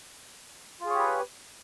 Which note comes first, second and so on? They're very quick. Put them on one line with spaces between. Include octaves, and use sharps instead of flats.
F4 G#4 C#5 G4 B4